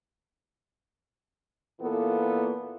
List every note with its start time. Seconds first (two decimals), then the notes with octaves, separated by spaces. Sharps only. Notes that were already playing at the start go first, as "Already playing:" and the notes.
1.79 A#2 E3 A#3 B3 A4